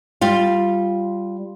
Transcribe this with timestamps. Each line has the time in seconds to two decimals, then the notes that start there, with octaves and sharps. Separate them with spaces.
0.21 G3 F4